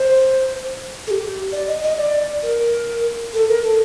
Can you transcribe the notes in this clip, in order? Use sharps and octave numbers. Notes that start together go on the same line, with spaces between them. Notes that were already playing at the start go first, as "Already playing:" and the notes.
Already playing: C5
A4
G4
D5
D#5
D#5
D5
A#4
A4
A#4
A4